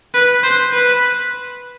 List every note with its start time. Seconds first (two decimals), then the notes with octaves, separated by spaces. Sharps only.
0.14 B4
0.43 C5
0.73 B4